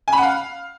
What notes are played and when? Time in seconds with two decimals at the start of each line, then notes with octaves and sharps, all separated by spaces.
0.08 G#5
0.13 B5
0.18 F#5
0.23 F5